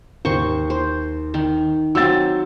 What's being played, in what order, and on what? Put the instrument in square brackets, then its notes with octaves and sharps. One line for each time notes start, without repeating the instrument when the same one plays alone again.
[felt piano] D#2 [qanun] C5 C#6
[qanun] C5
D#3
[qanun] F#3 C4 [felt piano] E6 A6